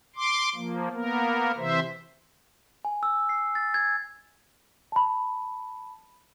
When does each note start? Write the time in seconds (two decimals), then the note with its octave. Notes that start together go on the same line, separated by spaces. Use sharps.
0.16 C6 D6
0.55 F3 A#3
0.93 A#3 B3 A#4
1.58 C3 E3 C5 E5
2.85 G#5
3.03 E6
3.29 C7
3.55 A6
3.74 G#6
4.92 A5 B5